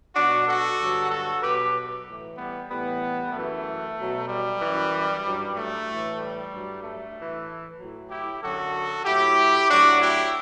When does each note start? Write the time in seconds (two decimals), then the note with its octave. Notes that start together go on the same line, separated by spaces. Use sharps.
0.15 B2 F#3 D4 F#4
0.47 F#4 A4
0.79 G2 D3 F#3
1.10 F#4 A4
1.42 B2 F#3 G4 B4
2.06 A2 E3
2.37 G3 B3
2.69 A2 E3 G3 B3
3.33 F#2 E3 A3
3.97 B2 F#3
4.28 G3
4.60 F#2 E3
5.24 G2 F#3
5.55 A3
5.87 A2 E3
6.19 G3
6.51 G2 F#3
6.83 A3
7.15 A2 E3
7.78 A2 F#3
8.10 E4 G4
8.42 F#2 D3 F#3 F#4 A4
9.05 A2 F#3 E4 G4
9.69 A2 F#3 D4 F#4
10.00 E4 G4